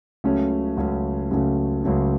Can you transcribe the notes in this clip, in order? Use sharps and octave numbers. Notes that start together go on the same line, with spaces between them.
C#2 C#3 F#3 A3 C#4
C#2 C#3 F#3 A3 C#4
C#2 C#3 F#3 A3 C#4
C#2 C#3 F#3 A3 C#4